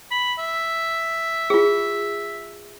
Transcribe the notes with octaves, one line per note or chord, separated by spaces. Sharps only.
B5
E5
F4 G#4